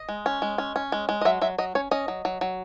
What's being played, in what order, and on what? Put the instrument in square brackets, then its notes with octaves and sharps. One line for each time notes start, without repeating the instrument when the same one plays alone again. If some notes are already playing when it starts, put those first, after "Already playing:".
Already playing: [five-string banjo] D#5
G#3
C#4
G#3
C#4
C#4
G#3
G#3
D#5
F#3 E5
F#3 E5
F#3 D#5
C#4 C#5
C#4 D#5
F#3
F#3
F#3